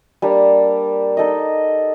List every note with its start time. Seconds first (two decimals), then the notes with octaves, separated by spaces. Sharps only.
0.22 G3 A#3 D4 G4
1.17 D#4 A4 D#5